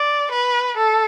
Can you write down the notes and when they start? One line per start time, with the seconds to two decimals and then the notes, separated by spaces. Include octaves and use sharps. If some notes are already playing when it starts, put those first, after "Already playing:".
Already playing: D5
0.32 B4
0.77 A4